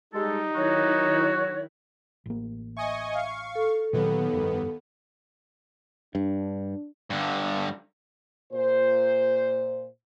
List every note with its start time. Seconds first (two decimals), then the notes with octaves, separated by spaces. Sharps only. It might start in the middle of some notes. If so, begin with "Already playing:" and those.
0.14 G3 G#3 D#4 G4 A4
0.55 D#3 F#3 E4 F#4 C#5
2.26 A1 A#3
2.77 D#5 E5 G#5 C#6
3.14 F5 C#6
3.55 A4
3.93 D#2 A#2 D#3 F#3 B3
4.33 F1 G2
6.15 G2 D4
7.10 G2 D3
8.53 A#2 C5